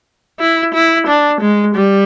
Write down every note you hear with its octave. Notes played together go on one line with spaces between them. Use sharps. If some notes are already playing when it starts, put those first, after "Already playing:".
E4
E4
D4
G#3
G3